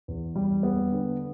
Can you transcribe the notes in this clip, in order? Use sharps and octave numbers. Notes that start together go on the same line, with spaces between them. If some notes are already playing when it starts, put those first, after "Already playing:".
E2
G3
B3
D3